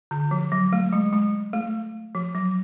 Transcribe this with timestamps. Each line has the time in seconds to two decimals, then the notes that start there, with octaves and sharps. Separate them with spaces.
0.11 D3
0.31 F3
0.52 F#3
0.73 A3
0.93 G#3
1.13 G#3
1.53 A3
2.15 F3
2.35 F#3